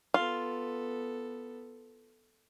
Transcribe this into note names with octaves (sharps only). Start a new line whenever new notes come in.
B3 F4 A4